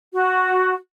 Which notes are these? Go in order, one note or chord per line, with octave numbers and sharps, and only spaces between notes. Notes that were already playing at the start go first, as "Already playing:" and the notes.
F#4